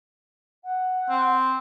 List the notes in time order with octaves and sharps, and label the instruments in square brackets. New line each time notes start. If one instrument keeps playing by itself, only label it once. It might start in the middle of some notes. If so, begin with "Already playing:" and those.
[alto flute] F#5
[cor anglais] C4